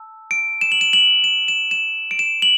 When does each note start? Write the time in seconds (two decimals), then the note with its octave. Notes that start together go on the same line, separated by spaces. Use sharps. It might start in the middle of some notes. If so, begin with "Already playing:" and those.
Already playing: A5 E6
0.31 D7
0.61 E7
0.72 F#7
0.81 E7
0.93 F#7
1.24 E7
1.48 E7
1.71 E7
2.11 D7
2.19 E7
2.42 F#7